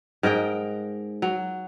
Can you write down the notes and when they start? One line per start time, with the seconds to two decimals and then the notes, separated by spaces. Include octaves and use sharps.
0.23 G#2 A#4 D#5 G5
1.22 F#3